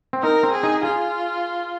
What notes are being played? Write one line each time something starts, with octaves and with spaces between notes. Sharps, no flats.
C4
D#4 A#4
C4
G#4
D#4
F4 G#4